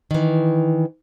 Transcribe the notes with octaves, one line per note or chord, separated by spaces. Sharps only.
D#3 E3